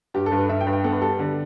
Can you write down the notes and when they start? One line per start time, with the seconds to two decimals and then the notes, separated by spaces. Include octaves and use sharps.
0.14 G2 G4
0.26 A4
0.32 G2
0.37 B4
0.49 G2 E5
0.61 G5
0.67 G2
0.73 G5
0.84 B3 A4
0.93 B4
1.01 G3 A4
1.19 D3